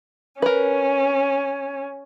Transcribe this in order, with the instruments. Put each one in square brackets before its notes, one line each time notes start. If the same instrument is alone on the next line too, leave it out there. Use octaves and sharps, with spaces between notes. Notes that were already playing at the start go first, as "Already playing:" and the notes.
[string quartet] C#4 [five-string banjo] A#4 B4